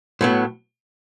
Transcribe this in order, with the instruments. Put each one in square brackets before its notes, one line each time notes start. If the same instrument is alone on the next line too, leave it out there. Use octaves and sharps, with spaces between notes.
[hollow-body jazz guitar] A2 F#3 B3